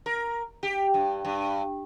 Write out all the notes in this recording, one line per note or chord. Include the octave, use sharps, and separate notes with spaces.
A#4
G4
G2
G2